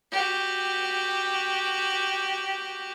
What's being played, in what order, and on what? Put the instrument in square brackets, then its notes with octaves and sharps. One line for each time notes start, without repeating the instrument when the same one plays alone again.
[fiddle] F#4 G4